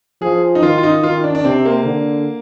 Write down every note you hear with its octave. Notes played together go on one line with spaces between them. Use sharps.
F3 G#4
D#4
D#3 F4
F4
D#4
D#3 F4
D4
D4
C3 C4
A#3
D3